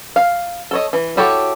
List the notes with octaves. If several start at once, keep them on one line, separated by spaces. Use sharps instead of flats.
F5
A4 C#5 D#5
E3
E4 F#4 G4 A4 C#5